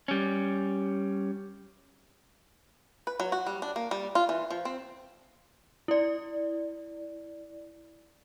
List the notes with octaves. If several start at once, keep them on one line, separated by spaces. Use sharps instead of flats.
G3 C#4
B4
F#3
F#4
G3
D4
A#3
G3
F4
E3
F3
C4
E4 D5